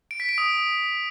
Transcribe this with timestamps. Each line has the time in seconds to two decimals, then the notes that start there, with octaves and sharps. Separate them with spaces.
0.11 D7
0.20 B6
0.29 D7
0.38 D#6